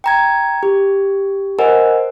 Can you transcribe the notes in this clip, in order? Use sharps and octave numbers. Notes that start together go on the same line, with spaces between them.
G5 A#5 G#6
G4
A#4 C5 D#5 F#5 G#5